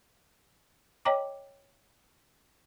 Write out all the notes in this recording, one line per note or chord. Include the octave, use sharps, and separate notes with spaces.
C#5 D#5 G5 A#5 D6